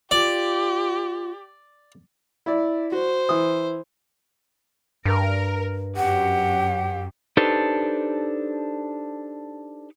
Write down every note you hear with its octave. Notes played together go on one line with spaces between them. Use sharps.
F4 G4 D5
E4 D5
F#4 C5
E3 D#6
G2 A#4
F#2 G4 F#5
D4 D#4 G4 A4 B4 C5